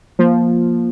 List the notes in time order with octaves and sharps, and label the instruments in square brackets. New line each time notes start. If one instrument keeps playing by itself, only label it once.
[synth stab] F3 [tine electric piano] A#3